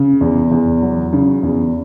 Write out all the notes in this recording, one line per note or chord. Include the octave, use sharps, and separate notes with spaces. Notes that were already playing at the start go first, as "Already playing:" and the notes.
Already playing: C#3
E2
E2
F#3
C#3
E2